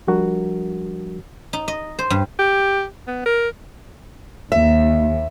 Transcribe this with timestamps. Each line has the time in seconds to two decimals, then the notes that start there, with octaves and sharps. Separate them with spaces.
0.07 F3 G3 D4 F#4 A#4
1.53 D#4
1.68 D#5
1.99 C5
2.10 G2
2.39 G4
3.08 B3
3.25 A#4
4.52 D#2 E5